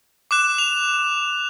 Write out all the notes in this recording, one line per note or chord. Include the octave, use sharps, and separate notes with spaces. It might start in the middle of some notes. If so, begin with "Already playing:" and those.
D6 F#6 E7
F7